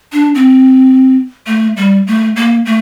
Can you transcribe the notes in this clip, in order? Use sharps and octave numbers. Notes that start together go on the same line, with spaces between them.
D4
C4
A3
G3
A3
A#3
A3